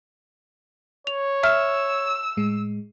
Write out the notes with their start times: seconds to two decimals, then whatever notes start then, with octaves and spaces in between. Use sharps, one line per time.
1.07 C#5 F7
1.43 E5 E6 F6
2.37 A2 G#3